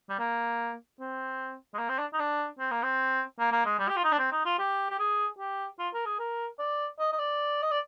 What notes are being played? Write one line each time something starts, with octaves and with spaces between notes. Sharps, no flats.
G3
A#3
C4
G#3
A#3
C4
D4
D#4
D4
C4
A#3
C4
A#3
A#3
G#3
G3
G4
F4
D#4
D4
C4
D#4
F4
G4
G4
G#4
G4
F4
A#4
G#4
A#4
D5
D#5
D#5
D5
D#5
D5